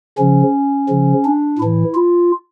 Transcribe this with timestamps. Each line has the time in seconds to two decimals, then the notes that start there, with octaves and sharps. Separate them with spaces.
0.18 C#3 F3 C#4
0.89 C#3 F3
1.24 D4
1.59 A2 E3 E4
1.94 F4